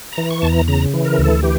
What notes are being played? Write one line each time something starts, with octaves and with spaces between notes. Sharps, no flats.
A#5
E3
C#6
E2 A5
A#5
C#3 A#5
E3
A#4
D2
A4
E3 G4